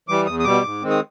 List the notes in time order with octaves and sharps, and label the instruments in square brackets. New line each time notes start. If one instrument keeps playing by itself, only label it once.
[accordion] E3 G3 D6
E2 D#6
D#6
B2 G3 D6
G#2
D#3 G#3 C4
D#6